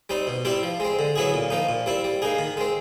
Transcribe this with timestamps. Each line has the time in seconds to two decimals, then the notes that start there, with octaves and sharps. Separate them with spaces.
0.09 G3 C4 D#4
0.27 B2
0.45 G3 C4 E4 G4
0.63 F3
0.80 G#3 C4
0.99 D3
1.16 F#3 B3 E4 G#4
1.34 A#2
1.50 F3 A#3 D#4
1.69 A#2
1.86 G3 C4 E4
2.04 G3
2.22 A#3 D#4 G#4
2.38 D#3
2.57 G#3 C4